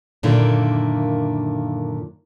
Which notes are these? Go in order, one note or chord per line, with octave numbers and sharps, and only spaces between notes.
F#2 A#2 D3 D#3 A#3 E4